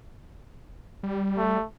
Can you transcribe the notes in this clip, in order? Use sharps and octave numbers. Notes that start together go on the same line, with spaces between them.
G3
A3